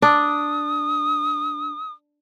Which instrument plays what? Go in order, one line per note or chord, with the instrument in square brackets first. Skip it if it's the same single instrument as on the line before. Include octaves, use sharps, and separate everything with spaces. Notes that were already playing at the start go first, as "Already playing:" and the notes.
[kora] D4 [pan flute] D#6